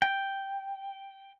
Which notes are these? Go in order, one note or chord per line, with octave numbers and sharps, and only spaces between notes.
G5